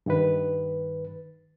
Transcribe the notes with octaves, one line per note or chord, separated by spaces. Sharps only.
G2 D#3 B4